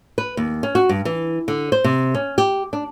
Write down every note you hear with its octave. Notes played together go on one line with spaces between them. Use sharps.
B4
D#2
C#4
F#4
G2
E3
D3
C5
C3
C#4
G4
D4